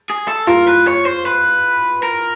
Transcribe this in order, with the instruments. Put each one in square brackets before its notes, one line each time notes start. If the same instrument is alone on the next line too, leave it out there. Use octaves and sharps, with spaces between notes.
[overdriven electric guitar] G#4
A4
[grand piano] F4 [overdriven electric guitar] A#4
[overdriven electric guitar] B4
C#5
C5
B4
A#4